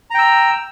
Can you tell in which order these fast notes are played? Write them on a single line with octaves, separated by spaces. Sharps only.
A#5 G5 E6